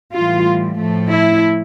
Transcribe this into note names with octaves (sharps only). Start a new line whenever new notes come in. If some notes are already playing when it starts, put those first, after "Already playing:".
A2 E3 G3 F4
A2 F3 A3
E4